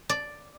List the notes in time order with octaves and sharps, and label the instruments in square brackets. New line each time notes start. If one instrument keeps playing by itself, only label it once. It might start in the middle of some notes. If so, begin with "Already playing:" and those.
[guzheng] D5